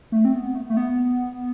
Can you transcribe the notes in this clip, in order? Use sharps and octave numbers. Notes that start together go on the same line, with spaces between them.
A3
C4
B3
A3
B3
A3
B3